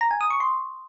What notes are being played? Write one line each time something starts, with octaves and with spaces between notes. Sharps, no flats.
A#5
G#5
D#6
C#6
C6